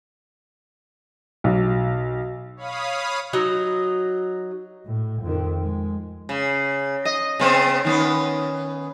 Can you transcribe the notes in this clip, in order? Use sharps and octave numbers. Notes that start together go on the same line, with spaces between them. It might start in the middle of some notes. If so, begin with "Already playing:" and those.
B1
C#5 F5 B5 D#6
F#3 D#4 D#5
A2
F2 D#3
G#3
C#3
D#5
C#3 B3 C4
D#3 B3 C#4